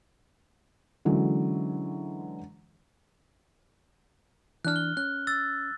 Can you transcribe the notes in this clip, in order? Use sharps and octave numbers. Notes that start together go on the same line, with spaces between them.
D3 E3 F#3 G#3 C#4
E3 D4 F6 F#6
G7
C#4 F#6
E6 A6